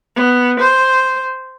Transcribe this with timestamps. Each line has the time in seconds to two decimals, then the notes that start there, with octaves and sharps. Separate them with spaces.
0.16 B3
0.60 C5